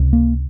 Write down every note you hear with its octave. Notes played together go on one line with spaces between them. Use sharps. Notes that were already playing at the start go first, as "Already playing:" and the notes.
Already playing: C#2 C3
A#3